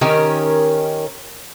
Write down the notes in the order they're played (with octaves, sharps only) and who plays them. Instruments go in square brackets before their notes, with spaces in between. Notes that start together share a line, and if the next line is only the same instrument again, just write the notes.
[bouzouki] D#3 C#4 G4 A#4